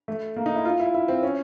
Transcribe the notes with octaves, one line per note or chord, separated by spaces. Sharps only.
A3
A#3
D#4
E4
F4
E4
E4
C4
C#4